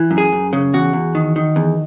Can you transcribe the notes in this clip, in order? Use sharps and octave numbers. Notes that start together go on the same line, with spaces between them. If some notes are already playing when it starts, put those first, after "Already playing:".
Already playing: E3
F#2
G#4
F#2
C#3
E2 F#4
E2
D#3
D#3
E2